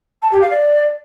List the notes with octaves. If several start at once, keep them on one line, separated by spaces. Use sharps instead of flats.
A5
G4
F5
D5